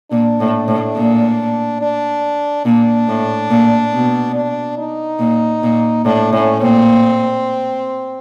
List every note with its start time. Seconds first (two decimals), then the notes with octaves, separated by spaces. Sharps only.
0.11 A#2 D4
0.40 A2
0.68 A2
0.96 A#2
1.81 D4
2.65 A#2 D4
3.08 A2
3.50 A#2
3.93 B2
4.35 D4
4.77 D#4
5.19 A#2
5.63 A#2
6.05 A2 D4
6.33 A2 C#4
6.61 A#2 C4